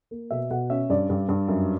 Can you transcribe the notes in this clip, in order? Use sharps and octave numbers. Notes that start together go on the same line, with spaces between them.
A#3
B2 E5
B2 F#5
C#4 E5
G2 D5
G2
G2
F#2